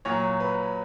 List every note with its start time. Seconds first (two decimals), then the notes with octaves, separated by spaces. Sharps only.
0.05 A#2 F#3 C#5
0.40 B4